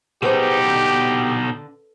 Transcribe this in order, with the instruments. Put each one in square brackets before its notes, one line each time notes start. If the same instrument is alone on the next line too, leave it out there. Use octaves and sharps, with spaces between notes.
[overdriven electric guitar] B2 D#4 [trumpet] G4 [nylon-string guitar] G#4 B4 C5
[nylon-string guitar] D3